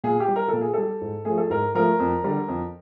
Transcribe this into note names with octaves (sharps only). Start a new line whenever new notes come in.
A#2 G#4
G4
G3
A#4
A#2 A4
G#4
G3 A4
G#2
F3 A3 G#4
A4
G#2 A#4
F3 A3 A#4
F2
D3 G3
F2